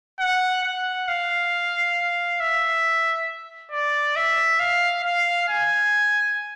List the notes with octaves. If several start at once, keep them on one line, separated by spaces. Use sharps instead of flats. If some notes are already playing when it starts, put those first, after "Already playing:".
F#5
F#5
F5
E5
D5
E5
F5
F5
G#5